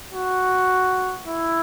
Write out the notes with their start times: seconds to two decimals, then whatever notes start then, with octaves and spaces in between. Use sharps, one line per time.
0.12 F#4
1.27 E4